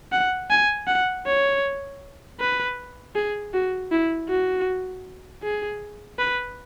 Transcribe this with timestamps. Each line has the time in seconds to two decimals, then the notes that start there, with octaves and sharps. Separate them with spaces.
0.13 F#5
0.50 G#5
0.88 F#5
1.26 C#5
2.40 B4
3.16 G#4
3.54 F#4
3.91 E4
4.29 F#4
5.43 G#4
6.19 B4